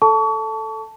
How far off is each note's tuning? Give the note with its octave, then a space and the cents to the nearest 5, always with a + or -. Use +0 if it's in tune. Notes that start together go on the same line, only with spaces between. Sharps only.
A4 +0 A5 +0 C#6 +35